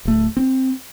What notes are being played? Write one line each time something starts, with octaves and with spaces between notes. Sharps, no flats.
D1 A3
C4